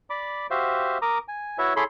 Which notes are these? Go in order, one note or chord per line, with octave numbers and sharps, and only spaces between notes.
D5 B5 D6
F#4 G4 C5 E5 F5
A#4 A#5 D6 D#6
G#5
E4 F#4 B4 C#5 E5
E4 G#4 A4 C#5 B5 C6